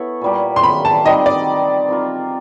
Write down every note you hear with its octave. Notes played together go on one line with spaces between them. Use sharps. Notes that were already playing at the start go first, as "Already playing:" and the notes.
Already playing: B3 E4 A4 C#5
A#2 G3 A#3
C6
B5
A5
D#3 G3 C4 D#5
D5
C4 F4 A#4